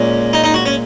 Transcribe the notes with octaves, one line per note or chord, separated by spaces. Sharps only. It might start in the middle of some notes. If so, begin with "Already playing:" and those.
Already playing: A#2 G#3 C#4
D#4
D#4
F#4
C#4